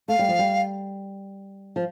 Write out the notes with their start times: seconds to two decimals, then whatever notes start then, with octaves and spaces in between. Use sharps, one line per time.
0.08 A3 F5
0.19 G3
0.29 F3
0.39 G3
1.76 F3